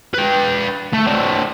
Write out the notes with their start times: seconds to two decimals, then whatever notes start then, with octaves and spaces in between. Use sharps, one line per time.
0.14 B4 G5
0.93 A3
1.07 C4 D4